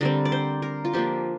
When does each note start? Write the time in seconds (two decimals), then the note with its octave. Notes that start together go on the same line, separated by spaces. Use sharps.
0.01 D3 G3 C4 A#4
0.25 D5
0.32 C5
0.62 A#4
0.85 F4
0.93 F3 A#3 D4 G4